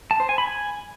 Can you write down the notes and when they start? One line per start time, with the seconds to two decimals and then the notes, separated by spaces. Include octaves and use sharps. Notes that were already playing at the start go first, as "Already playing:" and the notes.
0.11 A5
0.20 C5
0.29 G#5
0.38 B5
0.47 G#5